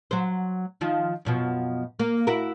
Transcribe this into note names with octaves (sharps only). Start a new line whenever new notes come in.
F#3 C5
D#3 F3 F4
F#2 B2 F3
A#3
E4 F#4 A#4